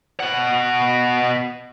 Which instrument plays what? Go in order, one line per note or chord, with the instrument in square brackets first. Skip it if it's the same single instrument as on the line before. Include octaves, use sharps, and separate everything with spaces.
[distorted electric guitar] B2 F#5